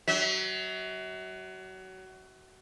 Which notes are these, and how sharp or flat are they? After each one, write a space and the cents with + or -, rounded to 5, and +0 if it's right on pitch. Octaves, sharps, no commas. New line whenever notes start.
F#3 +25 E5 -35